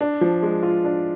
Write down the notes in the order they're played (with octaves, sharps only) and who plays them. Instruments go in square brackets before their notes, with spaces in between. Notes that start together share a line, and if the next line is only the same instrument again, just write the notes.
[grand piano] D4
F3
G#3
F4
D4